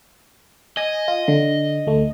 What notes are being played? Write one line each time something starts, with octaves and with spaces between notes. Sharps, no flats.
D#5 G#5
F4
D3
D2 A3